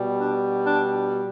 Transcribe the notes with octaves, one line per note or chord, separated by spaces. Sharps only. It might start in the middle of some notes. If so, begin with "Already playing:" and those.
Already playing: B2 G3
D4
D4